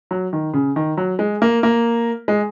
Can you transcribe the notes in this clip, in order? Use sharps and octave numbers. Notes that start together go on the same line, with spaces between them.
F#3
D#3
C#3
D#3
F#3
G#3
A#3
A#3
G#3